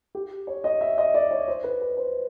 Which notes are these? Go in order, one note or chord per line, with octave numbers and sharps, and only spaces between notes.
G4
C#5
D#5
E5
D#5
D5
C#5
C5
B4
B4
C5